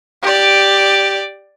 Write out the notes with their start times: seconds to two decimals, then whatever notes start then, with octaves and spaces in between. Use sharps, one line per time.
0.22 G4 D5